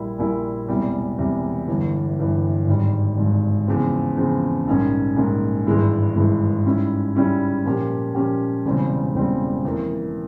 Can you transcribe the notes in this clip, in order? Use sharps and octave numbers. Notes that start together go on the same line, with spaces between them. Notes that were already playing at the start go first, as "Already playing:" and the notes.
Already playing: A#1 A#2 G3 A#3 E4
A#1 A#2 G3 A#3 E4
E1 E2 C3 G3
E1 E2 C3 G3
G1 G2 E3
G1 G2 E3
G#1 G#2 G3
G#1 G#2 G3
E2 C#3 F3 G#3 C4
E2 C#3 F3 G#3 C4
A#1 G#2 G3 A#3 C#4
A#1 G#2 G3 A#3 C#4
G#1 G2 E3 G#3 E4
G#1 G2 E3 G#3 E4
G#2 G3 C#4 E4
G#2 G3 C#4 E4
A#2 F3 A#3 C#4 G4
A#2 F3 A#3 C#4 G4
E1 E2 C#3 G3 C4
E1 E2 C#3 G3 C4
F2 E3 A#3